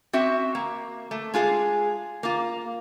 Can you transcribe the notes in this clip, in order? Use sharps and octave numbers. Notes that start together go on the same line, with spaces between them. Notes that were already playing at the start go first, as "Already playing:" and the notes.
C4 F#4 E5
A#3
A3
G#3 F4 G#4
A#3 F4